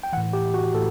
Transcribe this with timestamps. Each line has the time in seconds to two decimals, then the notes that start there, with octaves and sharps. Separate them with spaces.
0.03 G5
0.13 E3 F#5
0.17 A2
0.33 G4
0.54 F#4
0.75 A2 A4